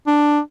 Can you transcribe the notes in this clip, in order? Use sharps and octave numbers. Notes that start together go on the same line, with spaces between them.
D4